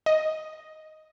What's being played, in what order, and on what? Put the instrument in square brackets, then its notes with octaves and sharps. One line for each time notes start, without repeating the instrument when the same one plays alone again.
[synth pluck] D#5